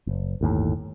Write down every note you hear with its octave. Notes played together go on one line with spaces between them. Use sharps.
F#1
G1 D#2 A2